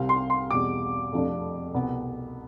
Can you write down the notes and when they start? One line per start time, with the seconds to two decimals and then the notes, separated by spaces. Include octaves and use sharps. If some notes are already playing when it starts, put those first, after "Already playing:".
Already playing: C2 C3 G3 C4 F5
0.09 C6
0.30 C6
0.50 E2 B2 G3 D6
1.12 F2 C3 F3 A3 D4
1.74 C2 B2 B3